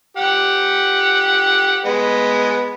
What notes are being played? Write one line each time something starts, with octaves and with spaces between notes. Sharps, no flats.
G4 F#5
G#3 B3